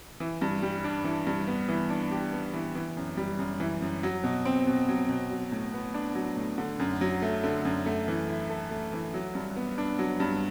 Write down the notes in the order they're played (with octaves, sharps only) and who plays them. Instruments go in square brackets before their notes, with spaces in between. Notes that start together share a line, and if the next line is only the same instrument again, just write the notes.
[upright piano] E3
G2
G3
D4
E3
G2
B3
E3
D4
G4
B3
E3
E3
F#2
G3
F#2
E3
F#2
F#3
B2
C4
B2
F#3
B2
F#3
A2
B3
D4
F#3
A2
D3
F#2
F#3
A3
D3
F#2
A3
E3
E4
A4
A3
E3
F#3
G2
B3
D4
F#3
G2